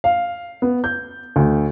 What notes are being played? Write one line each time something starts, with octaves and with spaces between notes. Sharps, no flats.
F5
B3
G6
D2